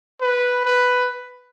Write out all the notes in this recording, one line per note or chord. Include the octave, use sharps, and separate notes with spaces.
B4
B4